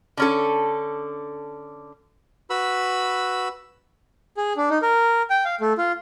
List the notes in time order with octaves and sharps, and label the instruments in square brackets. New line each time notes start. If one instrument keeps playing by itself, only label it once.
[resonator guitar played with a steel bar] D3 C#4 A4
[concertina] F#4 B4 B5 E6
[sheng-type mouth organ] G#4
D4
D#4
A#4
G5
F5
A3
F4